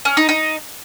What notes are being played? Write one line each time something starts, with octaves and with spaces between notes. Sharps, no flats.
C#4
D#4
D#4